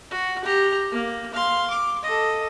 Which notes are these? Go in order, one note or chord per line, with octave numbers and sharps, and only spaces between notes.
F#4
G4 A#5
A#3
F5 C6
D6
A4 D#5